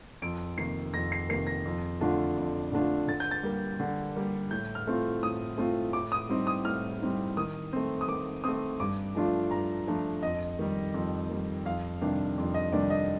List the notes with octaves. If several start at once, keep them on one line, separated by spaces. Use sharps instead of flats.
F2 D7
C3 D#3 A#3 C7
F2 A#6
C7
C3 D#3 A#3 C7
A#6
F2
D3 A3 D4 F4
F2
D3 A3 D4 F4
D3 A6
G6
A6
G3 A#3
D3
G3 A#3
A2 G6
F6
A3 C4 F4
A2 D#6
A3 C4 F4
A2 D6
D#6
G3 C4 D#4
D#6
A2 F6
G3 C4 D#4
D#3 D#6
A3 C4
D#6
D#3 D6
A3 C4 D#6
G2 D6
F3 A3 D4 F4
G2 A#5
F3 A3 D4 F4
F2 D#5
D#3 G3
F2
D#3 G3
F2 F5
C3 D#3 G3 D4
F2
D#5
C3 D#3 G3 D4 D5
D#5